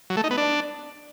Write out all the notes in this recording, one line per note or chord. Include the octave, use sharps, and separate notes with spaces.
F#3
A3
D#4
B3
D4